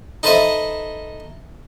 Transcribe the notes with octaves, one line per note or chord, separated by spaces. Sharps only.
D#4 A4 B4 C5 D#5 E5